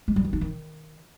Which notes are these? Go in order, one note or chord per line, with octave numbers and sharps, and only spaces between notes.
G#3
G3
D#3
D#4
D#3